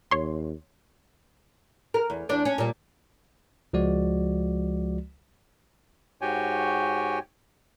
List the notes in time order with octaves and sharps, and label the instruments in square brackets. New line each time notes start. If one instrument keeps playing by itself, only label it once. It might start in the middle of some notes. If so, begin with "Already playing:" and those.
[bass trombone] D#2 [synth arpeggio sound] C#5 C6
[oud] A#4
E2
E2 D4 D5
C#4
A#2 G3
[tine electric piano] C#2 F3 G#3 F#4 D5
[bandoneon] G#2 F#4 G4 C#5 G5 G#5